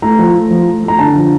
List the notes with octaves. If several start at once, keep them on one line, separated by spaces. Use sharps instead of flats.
A3 A#5
F3
A3
F3
A3
A3
A#5
D3 A5
F3